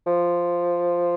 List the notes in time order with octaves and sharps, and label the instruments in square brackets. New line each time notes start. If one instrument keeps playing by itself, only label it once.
[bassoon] F3